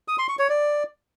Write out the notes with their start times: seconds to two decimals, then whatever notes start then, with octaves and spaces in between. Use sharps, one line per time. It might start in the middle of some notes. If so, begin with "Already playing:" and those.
0.08 D#6
0.18 C6
0.29 C#6
0.39 C#5
0.49 D5